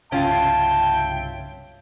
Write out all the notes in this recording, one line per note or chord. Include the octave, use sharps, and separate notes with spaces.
C2 G2 C#3 C#4 F4 E5 G5 A5